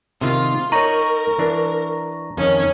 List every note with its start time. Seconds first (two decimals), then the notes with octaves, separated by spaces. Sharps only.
0.21 C3 D#3 F4
0.72 D#4 A#4 C#5 A#5 C#6 A#6
1.39 E3 D4
2.37 F2 D#3 C#4 C#5